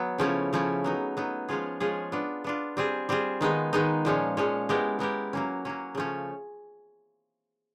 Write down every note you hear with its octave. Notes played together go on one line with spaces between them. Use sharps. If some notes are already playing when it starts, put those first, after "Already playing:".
Already playing: F#3 B3
C#3 F3 A3 C#4 E4
C#3 F3 A3 C#4 E4
F#3 B3 D#4
F#3 B3 D#4
F3 G#3 C#4 F4 G#4
F3 G#3 C#4 F4 G#4
B3 D4 F4
B3 D4 F4
G3 C4 F4 G#4
G3 C4 F4 G#4
D#3 G#3 B3 D#4
D#3 G#3 B3 D#4
A#2 F3 G#3 C#4
A#2 F3 G#3 C#4
G#3 B3 E4 G4 A#4
G#3 B3 E4 G4 A#4
F#3 A#3 C#4
F#3 A#3 C#4
C#3 F3 A3 C#4